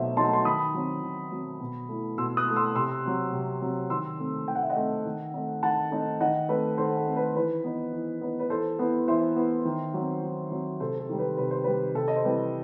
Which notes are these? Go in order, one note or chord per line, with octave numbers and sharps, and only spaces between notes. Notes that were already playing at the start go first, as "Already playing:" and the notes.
Already playing: B2 F#3 A3 D#4 C5 E5
F#3 A3 D#4 A5 C6
C6
D#3 B5 D#6
F#3 C4
D#3
F#3 C4
B2
A3 E4
B2 C6 E6
D#6 F#6
A3 E4
C6 E6
C3 C6 E6
F#3 C4
C3
F#3 C4
D#3 C6 E6
A3 C4
D#3 G5
F#5
E5
D#5 F#5
A3 C4
D#3
A3 C4 D#4
D#3 F#5 A5
A3 C4 D#4
D#3 D#5 F#5
A3 C4 B4
D#3 A4 C5
A4
A3 C4
B4
E3 B4
B3 D#4
E3
B3 D#4
B4
E3 A4 C5
B3 E4
E3 C5 E5
B3 E4
D#3
F#3 C4
D#3
F#3 C4
C3 A4 C5
A4
D#3 G3
B4
C3 B4
C5
D#3 G3 B4
C3 A4
D#5
C5
E3 G3 C4 B4